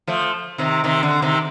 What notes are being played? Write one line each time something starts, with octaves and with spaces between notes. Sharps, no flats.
F3 A3
C3 D#3
C3 D#3
D3
C3 D#3